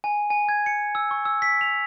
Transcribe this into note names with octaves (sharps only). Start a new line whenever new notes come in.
G#5
G#5
G#6
C#7
E6
C#6
E6
B6
F7